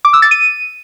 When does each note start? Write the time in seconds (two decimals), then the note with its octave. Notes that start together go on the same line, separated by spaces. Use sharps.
0.05 D6
0.13 E6
0.22 A6
0.31 D#7